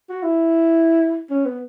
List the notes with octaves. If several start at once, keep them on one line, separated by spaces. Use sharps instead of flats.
F#4
E4
C#4
B3